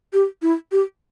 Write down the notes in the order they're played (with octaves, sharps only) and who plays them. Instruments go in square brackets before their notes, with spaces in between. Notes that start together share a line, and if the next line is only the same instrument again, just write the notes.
[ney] G4
E4
G4